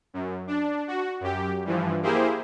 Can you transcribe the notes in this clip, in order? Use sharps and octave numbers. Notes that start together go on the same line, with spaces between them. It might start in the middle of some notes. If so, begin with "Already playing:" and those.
F#2
D4
F#4
F#2 G4
G2 E3 F3
A#3 E4 G4 G#4 C5